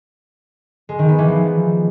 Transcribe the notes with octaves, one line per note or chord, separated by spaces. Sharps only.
G#3
D#3
B3
E3
F3